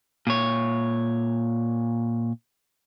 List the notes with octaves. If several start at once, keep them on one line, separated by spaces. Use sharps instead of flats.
A#2 C#5